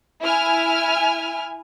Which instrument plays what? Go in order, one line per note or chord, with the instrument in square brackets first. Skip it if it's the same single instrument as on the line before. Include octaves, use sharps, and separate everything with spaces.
[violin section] E4 G#5 F6